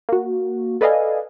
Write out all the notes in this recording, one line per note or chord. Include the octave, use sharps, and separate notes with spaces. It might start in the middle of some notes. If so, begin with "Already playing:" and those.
A#3 F#4
A4 B4 D5 D#5 F5 G#5